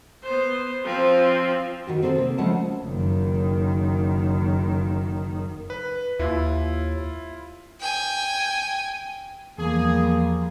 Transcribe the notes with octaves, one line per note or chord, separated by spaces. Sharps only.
B3 C5
F3 C4
D#3 F#4 G4
C4 G#4 A4
C3 A#3
C#3 F3 G#3 A3 F#5 A5
F#1 D#3
B4
D#2 E4 F4
G5 G#5
E2 F3 G3 A#3 G#4